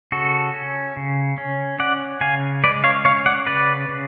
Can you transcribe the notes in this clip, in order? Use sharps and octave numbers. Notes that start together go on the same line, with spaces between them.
C#3 F#4 A4
C#4
C#3
C#4
C#4 D5 F#5
C#3 F5 G#5
G#3 B4 D5
C#5 F5
C#4 C#5 F5
D5 F#5
C#3 B4 D5
C#3